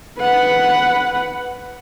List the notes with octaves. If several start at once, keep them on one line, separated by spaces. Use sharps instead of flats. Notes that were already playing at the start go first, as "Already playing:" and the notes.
B4 F#5